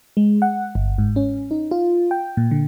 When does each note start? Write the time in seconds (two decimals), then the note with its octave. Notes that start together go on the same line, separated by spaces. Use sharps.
0.17 G#3
0.42 F#5
0.75 G1
0.98 G#2
1.16 C#4
1.51 D#4
1.71 F4
2.11 G5
2.37 A#2
2.51 D3